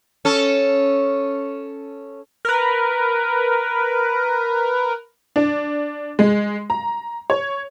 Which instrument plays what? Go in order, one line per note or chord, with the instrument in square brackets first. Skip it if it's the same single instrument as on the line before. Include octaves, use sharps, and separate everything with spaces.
[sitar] C#4 A4
[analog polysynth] A#4 B4
[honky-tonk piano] D4
G#3
A#5
C#5